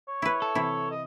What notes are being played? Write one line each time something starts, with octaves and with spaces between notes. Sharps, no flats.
C#5
E4 B4
A4
C3 E3 E4
D#5